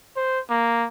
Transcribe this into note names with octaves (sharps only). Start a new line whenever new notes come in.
C5
A#3